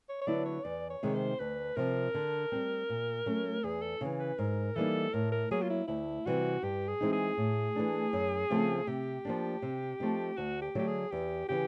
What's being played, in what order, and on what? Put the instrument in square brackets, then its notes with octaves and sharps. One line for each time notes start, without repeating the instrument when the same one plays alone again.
[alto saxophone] C#5
C#5
[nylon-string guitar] D3 F#3 B3 E4 [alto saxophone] D5
[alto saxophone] C#5
[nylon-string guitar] E2 [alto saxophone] D5
[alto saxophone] C#5
[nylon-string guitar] C3 D#3 G#3
[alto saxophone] C5
[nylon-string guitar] D2 [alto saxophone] B4
[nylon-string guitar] C3 F3 [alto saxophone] A#4
[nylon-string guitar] D3
G3 C4
A#2
F#3 A3 C#4
[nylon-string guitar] E2 [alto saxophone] G#4
[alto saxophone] A4
[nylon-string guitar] C#3 E3
[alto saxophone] B4
[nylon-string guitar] G#2 [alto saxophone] A#4
[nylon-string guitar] E3 G3 A#3 D#4 [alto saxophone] A4
[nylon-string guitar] A2 [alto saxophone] A#4
[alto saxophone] A#4
[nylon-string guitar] F#3 A#3 [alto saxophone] G#4
[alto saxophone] F4
E4
[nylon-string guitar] D2 [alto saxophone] E4
[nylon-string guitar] C3 E3 G3 [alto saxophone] F#4
[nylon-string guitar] G2 [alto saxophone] G4
[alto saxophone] G#4
[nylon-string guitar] E3 G#3 C4 D#4
[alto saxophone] G#4
[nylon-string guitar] A2
E3 A3 D4
F#2
C#3 F3 A3 C4
[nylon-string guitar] C3 [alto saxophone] G4
[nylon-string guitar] F3 A#3 D4
C3
F3 A3 C4 D#4
[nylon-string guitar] D2 [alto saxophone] F#4
[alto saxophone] G4
[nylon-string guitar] D3 F#3 A3 [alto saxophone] G4
[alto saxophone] G#4
[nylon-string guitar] E2 [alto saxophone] G4
[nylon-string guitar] C#3 E3 [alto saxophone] G4